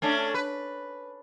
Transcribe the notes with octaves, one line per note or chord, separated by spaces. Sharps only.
A3 C#4 D4
B4